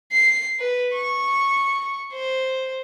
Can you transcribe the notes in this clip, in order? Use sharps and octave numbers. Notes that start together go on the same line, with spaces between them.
C7
B4
C#6
C5